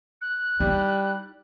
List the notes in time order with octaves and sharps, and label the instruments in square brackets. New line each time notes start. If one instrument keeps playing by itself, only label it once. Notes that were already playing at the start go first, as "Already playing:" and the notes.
[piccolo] F#6
[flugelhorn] G3 [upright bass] D#4 E4